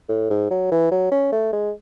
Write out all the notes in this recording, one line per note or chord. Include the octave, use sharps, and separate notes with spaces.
A2
G#2
F#3
E3
F#3
C#4
A3
G#3